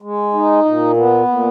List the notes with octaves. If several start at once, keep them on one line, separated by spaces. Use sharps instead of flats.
G#3
D#4
A#2
B3
A#2